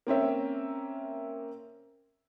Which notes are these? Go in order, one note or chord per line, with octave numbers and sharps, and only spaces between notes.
A#3 C4 C#4 E5